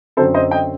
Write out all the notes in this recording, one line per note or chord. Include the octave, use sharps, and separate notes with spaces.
F#2 D3 F#3 C4 A4 C5
C5 D#5
D#5 G5